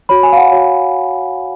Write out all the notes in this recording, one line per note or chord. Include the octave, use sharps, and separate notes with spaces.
F#4 C#5 B5
G#5
F5
F#5
F#4 C#5